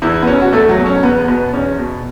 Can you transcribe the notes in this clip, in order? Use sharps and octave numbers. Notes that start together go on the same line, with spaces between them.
E2 E3 E4
B3
B2 C#4
F#4
E2 A3 A4
F#3 F#4
B2
C#4
E2 B3
B2 B3
E2 C#4
B2